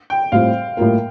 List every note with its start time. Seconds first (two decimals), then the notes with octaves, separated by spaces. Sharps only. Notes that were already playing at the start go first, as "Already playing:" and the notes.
0.10 G5
0.32 A2 G3 C4 F4 C5 F5
0.77 A2 G3 A#3 F4 A#4